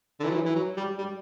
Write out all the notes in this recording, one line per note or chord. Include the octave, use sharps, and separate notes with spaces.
D3
E3
F#3
E3
E3
F#3
G3
G3